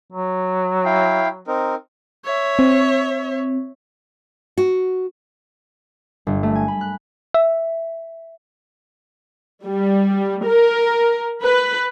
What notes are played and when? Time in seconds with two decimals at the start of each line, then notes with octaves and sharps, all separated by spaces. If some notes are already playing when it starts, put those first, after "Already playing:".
0.12 F#3
0.85 E4 F5 G5
1.47 C4 D#4 A#4
2.24 C#5 E5
2.59 C4
4.57 F#4
6.27 G1
6.43 A3
6.55 G#5
6.68 B5
6.81 F#6
7.34 E5
9.65 G3
10.45 A#4
11.44 B4